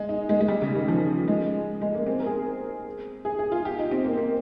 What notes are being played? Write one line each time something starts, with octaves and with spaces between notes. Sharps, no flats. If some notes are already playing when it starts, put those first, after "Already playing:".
Already playing: G#3
D#4
G#3
G#3
G3
C#3
D#3
F3
G#3
G#3
A#3
C4
A#4
G#4
G#4
G#4
F4
G4
D#4
C4
A#3
A#3